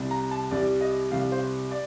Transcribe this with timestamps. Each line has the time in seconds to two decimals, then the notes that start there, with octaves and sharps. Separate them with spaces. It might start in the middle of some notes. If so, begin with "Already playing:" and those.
Already playing: C2 C3 G3
0.11 A#5
0.31 A5
0.51 C2 C3 G3 D5
0.81 D#5
1.11 C2 C3 G3 F5
1.32 C5
1.71 D5